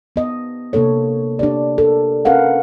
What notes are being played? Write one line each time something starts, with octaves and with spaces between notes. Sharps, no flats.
B3 D#5
C3 A#3 D4 A4 C#5
D4 G4 D5
A4 A#4
C4 C#4 A#4 B4 F5 F#5